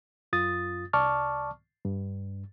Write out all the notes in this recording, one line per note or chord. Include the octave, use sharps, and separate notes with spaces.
F#2 F4 D#6 A6
C2 D5 A5 C#6 D6 F6
G2